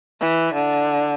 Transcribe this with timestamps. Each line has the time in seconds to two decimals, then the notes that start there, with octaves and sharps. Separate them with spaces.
0.21 E3
0.54 D3